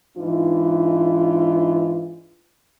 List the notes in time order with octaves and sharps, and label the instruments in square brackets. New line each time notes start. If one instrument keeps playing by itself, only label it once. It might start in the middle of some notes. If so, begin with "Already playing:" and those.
[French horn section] G#2 E3 D4 D#4 F4